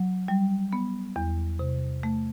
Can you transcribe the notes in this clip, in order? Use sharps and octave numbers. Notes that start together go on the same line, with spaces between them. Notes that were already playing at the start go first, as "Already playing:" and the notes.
Already playing: F#3
G3
B3
E2
C3
A3